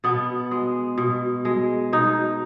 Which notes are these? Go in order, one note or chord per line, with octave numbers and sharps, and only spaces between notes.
B2 B3
G#3
B2
G#3
B2 D#4